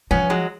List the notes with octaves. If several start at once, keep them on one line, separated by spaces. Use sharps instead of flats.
F3 B3 C#4
F#3 G#3